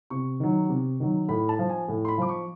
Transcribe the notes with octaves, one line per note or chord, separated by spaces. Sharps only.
C3 C#6
D#3 F#3
C3
D#3 F#3
A2 B5
A5
F3
G#5
A2
C6
B5
F3 D6
C#6